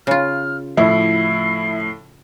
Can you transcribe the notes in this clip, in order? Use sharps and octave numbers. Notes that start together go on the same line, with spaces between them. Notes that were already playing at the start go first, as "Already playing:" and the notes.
C#3 F4 F6
A2 F3 E4 C7